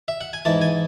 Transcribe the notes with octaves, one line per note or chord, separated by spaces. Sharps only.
E5
F#5
G#5
G#2 E3 A5
G#5